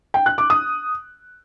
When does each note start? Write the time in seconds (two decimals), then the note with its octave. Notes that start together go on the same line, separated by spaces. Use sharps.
0.14 G5
0.26 F#6
0.38 D6
0.50 D#6